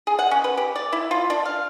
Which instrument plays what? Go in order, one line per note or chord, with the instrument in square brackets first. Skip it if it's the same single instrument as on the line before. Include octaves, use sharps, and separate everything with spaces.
[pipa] G#4
F#5
C#4
B4
G4
D5
E4
F4
D4
F5